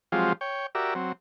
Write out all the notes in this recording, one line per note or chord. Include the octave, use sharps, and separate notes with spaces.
F3 F#3 G#3 C4 F4 G4
C#5 G5
F#4 G4 A#4 D5 E5
F#3 C4